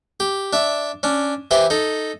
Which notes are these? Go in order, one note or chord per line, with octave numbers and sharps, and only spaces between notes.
G4
D4 E5
C#4 D4
E3 E4 G4 C5
D#4 A4